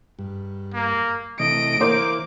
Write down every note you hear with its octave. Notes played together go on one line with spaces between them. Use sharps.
G2
A#3
C3 E3 A3 D#5 D7
E3 A#3 C5 D6 G6